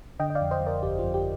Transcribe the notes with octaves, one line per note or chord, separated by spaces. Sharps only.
D3 D#5 G5
D#5
D5 F5
F2
C5 D#5
F2
A#4 D5
G1 G4
F2 F4
G4